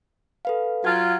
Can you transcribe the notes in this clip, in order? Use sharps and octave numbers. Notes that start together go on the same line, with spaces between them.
A4 B4 F5
F#3 F4 F#4 F#5 G#6